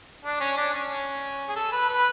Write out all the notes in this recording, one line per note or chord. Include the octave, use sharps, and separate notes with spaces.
D4
C#4
D4
C#4
G#4
A4
B4
B4